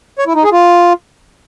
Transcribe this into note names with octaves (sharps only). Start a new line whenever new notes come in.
C#5
E4
D#4
G#4
F4